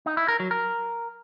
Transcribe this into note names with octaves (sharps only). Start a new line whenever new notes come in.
D#4
E4
A#4
F#3
A#4